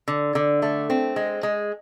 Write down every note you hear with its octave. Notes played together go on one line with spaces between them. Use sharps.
D3
D3
A3
C4
G#3
G#3